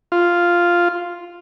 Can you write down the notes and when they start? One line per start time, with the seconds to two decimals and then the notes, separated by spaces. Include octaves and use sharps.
0.12 F4